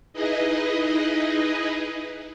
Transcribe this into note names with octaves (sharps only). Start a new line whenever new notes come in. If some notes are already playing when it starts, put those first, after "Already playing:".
D#4 E4 G#4 B4 D#5